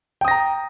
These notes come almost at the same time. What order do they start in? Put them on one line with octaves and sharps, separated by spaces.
G5 D#6 A#6 A#5